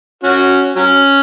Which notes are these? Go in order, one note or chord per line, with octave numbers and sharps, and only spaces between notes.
C#4 F#4
F#3 C#4